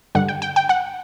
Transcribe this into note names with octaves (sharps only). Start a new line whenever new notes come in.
G2 D3 G3 F#5
G5
G5
G5
F#5